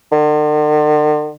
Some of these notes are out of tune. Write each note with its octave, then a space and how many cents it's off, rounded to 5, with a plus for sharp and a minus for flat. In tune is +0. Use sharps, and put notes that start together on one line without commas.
D3 +45